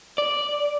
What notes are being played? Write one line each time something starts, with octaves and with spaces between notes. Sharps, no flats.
D5